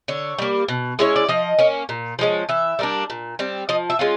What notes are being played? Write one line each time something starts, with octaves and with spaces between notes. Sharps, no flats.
D3 C#5
G3 A#3
B2
G#3 C#4 E4 C#5
D5
F3 D#5
A#3 C#4
A#2
F3 G#3 C#4
E3 E5
G3 A#3 D4
A#2
G3 C4
F3 D#5
E5
G#3 C#4 F4